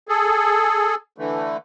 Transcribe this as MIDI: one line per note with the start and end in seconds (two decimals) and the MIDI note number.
0.09 0.95 68
0.09 0.95 69
1.18 1.57 50
1.18 1.57 52
1.18 1.57 57